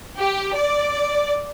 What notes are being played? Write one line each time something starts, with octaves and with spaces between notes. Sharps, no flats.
G4
D5